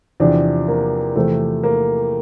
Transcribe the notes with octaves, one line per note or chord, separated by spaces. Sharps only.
E2 C3 F3 D4
A#3
E2 C3 F3 A3
A#3